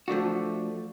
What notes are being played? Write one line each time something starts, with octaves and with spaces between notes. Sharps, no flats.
F3 A3 D4 F#4